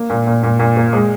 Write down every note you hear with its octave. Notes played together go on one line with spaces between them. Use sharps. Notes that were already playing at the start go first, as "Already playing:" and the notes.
Already playing: A#3
A#2
A#2
A#2
A#2
A#3
G#3